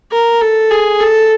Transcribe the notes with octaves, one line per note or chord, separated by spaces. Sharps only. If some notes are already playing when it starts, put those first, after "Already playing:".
A#4
A4
G#4
A4